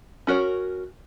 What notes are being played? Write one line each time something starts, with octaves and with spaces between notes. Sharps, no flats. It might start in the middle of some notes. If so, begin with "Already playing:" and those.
C#4 F#4 A#4 C#5